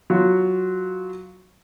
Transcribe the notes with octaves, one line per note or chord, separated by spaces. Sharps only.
F#3 F4